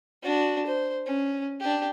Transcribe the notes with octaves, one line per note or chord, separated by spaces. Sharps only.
D4 F#4
C5
C#4
D4 G4